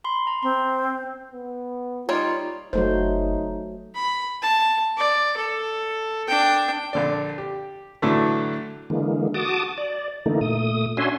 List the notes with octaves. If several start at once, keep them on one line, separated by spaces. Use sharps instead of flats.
B5 C6
A#5
C4 C6
B3
G3 A#3 D#4 F4 C#5
F#1 F#3 A3 D#4 C5
B5
A5
D5
A4
D4 G5
A#1 D3 D5
G4
A2 D3 E3 F#3 A3
D3 E3 G#3 A#3
F#4 A5 D6 D#6
D5
D3 E3 A3 A#3 D#4
A#2 A3 D#6
C#4 D4 F#4 E5 G#5 C6